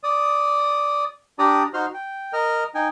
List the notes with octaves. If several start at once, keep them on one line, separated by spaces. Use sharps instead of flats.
D5 D#6
D4 G4 D5 A#5 D#6
D#4 F#4 C5 C6 F6
G5
A#4 D#5 F6
D#4 G5 G#5